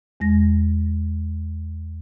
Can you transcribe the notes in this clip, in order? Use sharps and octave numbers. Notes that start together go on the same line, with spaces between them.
E2 G#3 A#6